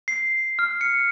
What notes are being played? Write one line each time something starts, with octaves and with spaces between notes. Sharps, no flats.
C7
F6
C#7